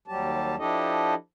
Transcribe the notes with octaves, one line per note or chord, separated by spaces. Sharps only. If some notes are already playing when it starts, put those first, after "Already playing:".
D#2 F#3 G3 G4 A5
F3 D4 E4 G4 A4 D#5